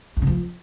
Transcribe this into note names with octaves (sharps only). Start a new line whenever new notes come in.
E2
C#3
F3